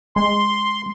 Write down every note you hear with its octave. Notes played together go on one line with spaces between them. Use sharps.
G#3 C6